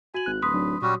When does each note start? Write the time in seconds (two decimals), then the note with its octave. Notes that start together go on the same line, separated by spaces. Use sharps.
0.14 F#4 G#5 F#7
0.26 G#1 F#6
0.42 D1 B4 C6 D#6 B6
0.54 F#3 D4 D#4
0.82 A#2 F#3 G3 C#4 F#4